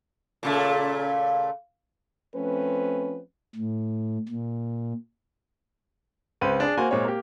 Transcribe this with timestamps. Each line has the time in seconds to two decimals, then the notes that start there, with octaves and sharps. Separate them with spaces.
0.43 A#2 C#3 A3
2.34 F3 A3 C4 C#4 B4
3.56 A2
4.29 A#2
6.41 C#2 C4 B4 C5 D#7
6.60 D4 G#4
6.77 A#3 F#4 C5 G#5
6.91 A#2 G#3 C4 C#5
7.05 A#3 G4